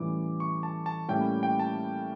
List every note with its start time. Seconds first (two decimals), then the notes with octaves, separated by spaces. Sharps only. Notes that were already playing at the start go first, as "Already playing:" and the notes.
Already playing: A2 E3 G3 C#4 E4 D6
0.40 C#6
0.63 A5
0.86 A5
1.08 A2 G3 A#3 C#4 E4 G5
1.43 G5
1.60 A5